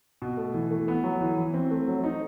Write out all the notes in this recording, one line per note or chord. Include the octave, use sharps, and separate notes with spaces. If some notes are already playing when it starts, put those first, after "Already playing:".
B2
A3
E3
A3
B3
F#3
E3
E3
C4
A3
F#3
D#4